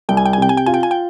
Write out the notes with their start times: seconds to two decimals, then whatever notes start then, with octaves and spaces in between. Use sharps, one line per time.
0.09 C2 G5
0.17 G#5
0.26 G5
0.33 G#5
0.38 C3 G5
0.49 G#5
0.57 G5
0.66 F4 G#5
0.74 G5
0.83 G#5
0.91 G5